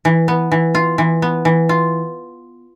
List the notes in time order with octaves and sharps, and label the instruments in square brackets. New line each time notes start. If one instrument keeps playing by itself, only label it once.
[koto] E3
B3
E3
F4
E3
B3
E3
F4